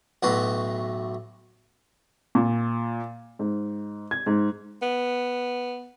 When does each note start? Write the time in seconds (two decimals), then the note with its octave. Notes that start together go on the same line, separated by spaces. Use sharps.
0.23 B1 A2 F#4 B4
2.35 A#2
3.39 G#2
4.11 G#6
4.26 G#2
4.82 B3